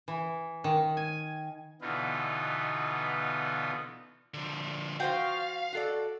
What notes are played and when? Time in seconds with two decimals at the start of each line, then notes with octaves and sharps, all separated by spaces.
0.08 E3
0.64 D#3
0.97 G#5
1.81 B2 D3 E3 B3 D#4 F4
4.34 D3 F3
5.00 F3 F#4 C5 F5 G5
5.72 F#4 A4 D5